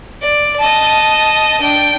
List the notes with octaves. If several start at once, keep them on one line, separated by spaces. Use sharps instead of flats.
D5
D#5 A5
D4 G5